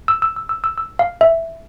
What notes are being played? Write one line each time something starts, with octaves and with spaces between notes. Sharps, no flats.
E6
E6
E6
E6
E6
E6
F5
E5